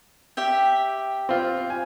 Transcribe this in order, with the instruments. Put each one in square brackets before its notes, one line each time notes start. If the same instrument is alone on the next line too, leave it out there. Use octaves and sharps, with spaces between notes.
[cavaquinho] G4 E5 G5
[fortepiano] C4 F4
G#5